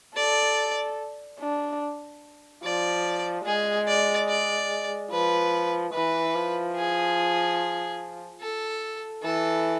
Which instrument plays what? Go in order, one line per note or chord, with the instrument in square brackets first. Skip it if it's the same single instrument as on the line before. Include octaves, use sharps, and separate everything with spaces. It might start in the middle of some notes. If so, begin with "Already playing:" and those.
[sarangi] A4 [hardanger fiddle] D5
[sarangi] D4
[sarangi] F3 [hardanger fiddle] D5
[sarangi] G#3 [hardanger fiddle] G#4
[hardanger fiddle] D5
D5
[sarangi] F3 [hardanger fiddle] B4
[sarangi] E3 [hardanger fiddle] B4
[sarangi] F3
[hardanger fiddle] G#4
A4
[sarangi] E3 [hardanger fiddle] A4